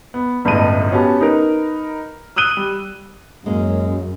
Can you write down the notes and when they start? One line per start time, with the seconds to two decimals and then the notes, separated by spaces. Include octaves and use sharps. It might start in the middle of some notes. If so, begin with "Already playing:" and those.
0.14 B3
0.45 G1 C#2 A2 D#5 A5 D#7
0.91 B3 C#4 F#4 G4 A5
1.21 D#4 A#4 B4
2.36 D#6 E6 F#6 D#7 G7
2.57 G3
3.46 F#2 G#3 A#3 C#4